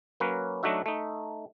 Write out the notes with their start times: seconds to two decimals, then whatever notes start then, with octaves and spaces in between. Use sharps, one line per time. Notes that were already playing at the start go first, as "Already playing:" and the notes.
0.20 F#3 A#3 C#4 B4
0.63 F#3 A3 D4 D#4 F#4 E5
0.86 A3 D#4